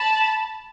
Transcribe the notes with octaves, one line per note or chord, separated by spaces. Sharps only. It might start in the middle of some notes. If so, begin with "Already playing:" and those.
Already playing: A5 B5